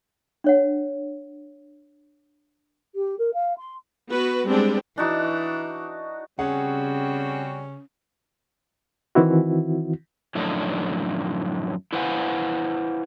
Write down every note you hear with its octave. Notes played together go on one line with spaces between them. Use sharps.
D4 C#5 F#5
G4
A#4
F5
C6
B3 F#4 B4
G3 G#3 B3 C4 D4 G4
E3 D4 D#4 F#4
C#3 G3 C4 C#4 F#4 G#4 F#5
D#3 E3 C4 E4 F#4
F#2 A2 D3 F3 D4 D#4
E4 B4 C5 F5 F#5 G#5